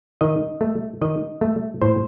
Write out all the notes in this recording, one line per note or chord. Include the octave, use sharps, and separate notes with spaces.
D#3 D#5
A3
D#3 D#5
A3
A2 C5